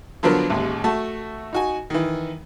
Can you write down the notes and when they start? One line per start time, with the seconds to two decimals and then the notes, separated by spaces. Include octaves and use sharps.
0.23 D3 F3 F#3 B3 D4 A#4
0.50 A1 D#2 G#3
0.84 A3 F#4 A5
1.53 D#4 F#4 G#5
1.90 D#3 E3